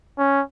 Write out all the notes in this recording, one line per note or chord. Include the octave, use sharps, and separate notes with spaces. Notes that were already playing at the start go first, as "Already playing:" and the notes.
C#4